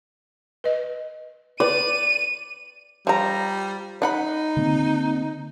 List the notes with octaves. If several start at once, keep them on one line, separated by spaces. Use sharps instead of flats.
B4 D#5
B4 D5 D#7
F3 G3 A#5
D4 D#4 F#5 B5
D3 A#3 C4